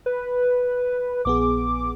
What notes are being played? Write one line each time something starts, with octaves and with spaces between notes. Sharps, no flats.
B4
A#1 B3 G#4 D6